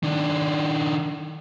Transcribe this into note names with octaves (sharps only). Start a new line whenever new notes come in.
D#3 D4